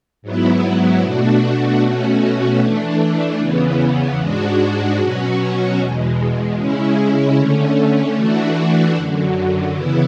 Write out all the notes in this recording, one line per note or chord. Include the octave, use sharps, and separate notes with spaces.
G#2 F#3 B3 E4
B2 A3 D4 F#4
B2 A3 C#4 F#4
E3 A3 D4
E2 C#3 E3 B3
G#2 G#3 D4 F#4
B2 F#3 C#4 F#4
E2 B2 G#3
C#3 G#3 C#4 E4
D3 A3 C#4
E3 A3 D4 F#4
F#2 D3 F#3
C#3 E3 B3 E4